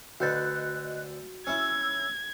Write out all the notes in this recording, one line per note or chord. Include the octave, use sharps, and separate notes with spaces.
D2 D3 F#4 B4 D#5 F#6 G6 A6
C#4 E4 E6 G#6